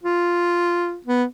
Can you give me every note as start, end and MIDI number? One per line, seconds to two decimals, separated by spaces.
0.03 0.98 65
1.06 1.24 59